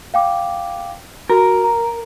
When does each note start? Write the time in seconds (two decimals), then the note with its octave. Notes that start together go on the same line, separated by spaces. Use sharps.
0.14 F5 G5 D6
1.30 F#4 A#4
1.64 A#5